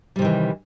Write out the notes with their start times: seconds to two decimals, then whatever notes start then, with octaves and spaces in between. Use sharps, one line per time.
0.16 G3
0.19 C3
0.22 D#3
0.25 E3